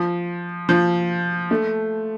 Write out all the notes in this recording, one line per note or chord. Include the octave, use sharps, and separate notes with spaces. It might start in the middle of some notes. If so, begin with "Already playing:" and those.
Already playing: F3
F3
A3